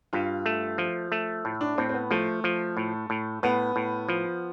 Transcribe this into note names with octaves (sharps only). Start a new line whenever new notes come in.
G2 F4
A3
F3
A3
A2
D4
A2 C4
C4
B3
F3 A3
F3
A2
A2
A2 B3
A2
F3